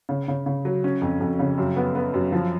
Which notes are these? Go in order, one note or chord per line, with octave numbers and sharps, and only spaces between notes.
C#3
C#3
C#3
F#3
C#4
F2
F2
C#3
F#2
B3
B3
F#2
F3